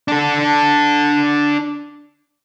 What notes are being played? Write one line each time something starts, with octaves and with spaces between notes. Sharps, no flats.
D4 A4